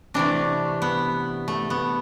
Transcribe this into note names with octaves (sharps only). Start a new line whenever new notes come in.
C3 E3 A3 D4
B3
A3
B3